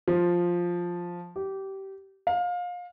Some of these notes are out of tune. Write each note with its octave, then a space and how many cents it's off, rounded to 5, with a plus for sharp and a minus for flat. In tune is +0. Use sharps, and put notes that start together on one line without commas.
F3 +5
G4 -20
F5 +25